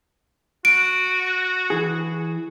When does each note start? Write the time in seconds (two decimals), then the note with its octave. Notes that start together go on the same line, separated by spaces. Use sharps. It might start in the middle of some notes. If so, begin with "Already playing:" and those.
0.65 F#4 D7
1.70 E3 G#4